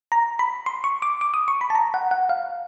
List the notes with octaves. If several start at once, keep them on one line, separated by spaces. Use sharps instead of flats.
A#5
B5
C6
C#6
D6
D6
D#6
C#6
B5
A5
A#5
F#5
F#5
F5